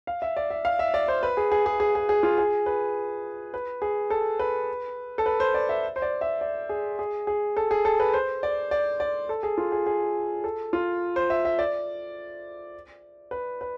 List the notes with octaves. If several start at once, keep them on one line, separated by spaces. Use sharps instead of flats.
F5
E5
D5
E5
F5
E5
D5
C5
B4
G#4
G#4
G#4
G#4
G#4
G#4
F4
G#4
B4
B4
G#4
A4
B4
A4
B4
C5
D5
E5
C5
D5
E5
D5
G#4
G#4
G#4
A4
G#4
A4
B4
C5
D5
D5
D5
A4
G#4
F4
G#4
G#4
A4
F4
C5
E5
E5
D5
B4
B4